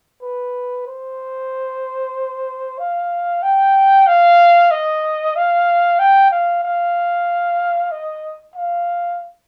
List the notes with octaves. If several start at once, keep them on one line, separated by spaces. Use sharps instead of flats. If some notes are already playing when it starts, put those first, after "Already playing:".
B4
C5
F5
G5
F5
D#5
F5
G5
F5
F5
D#5
F5